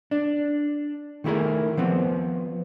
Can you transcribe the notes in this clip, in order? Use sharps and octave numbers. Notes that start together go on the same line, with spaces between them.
D4
D#3 A3 E4 G#4 A#4
F3 B3 C4